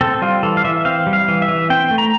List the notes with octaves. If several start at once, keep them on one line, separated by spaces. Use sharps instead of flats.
C4 A4
G3 F4
E3 A4
F5
E3 E5
C4 F5
G3
F5
E3
E5
E3
C4 G5
A3
A#5